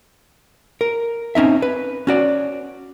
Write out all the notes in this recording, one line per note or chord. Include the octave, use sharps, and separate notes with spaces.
A#4
C4 C#4 D#4 E5
B4
C#4 F#4 D5